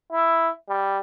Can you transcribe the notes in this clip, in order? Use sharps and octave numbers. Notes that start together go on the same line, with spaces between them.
E4
G3